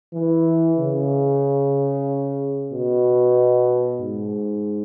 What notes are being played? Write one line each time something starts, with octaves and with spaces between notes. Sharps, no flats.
E3
C#3
B2
G#2